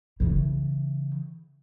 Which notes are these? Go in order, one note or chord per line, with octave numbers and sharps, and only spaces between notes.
C#3 E3